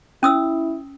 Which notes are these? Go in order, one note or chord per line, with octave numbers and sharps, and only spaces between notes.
C#4 E4 D#6 E6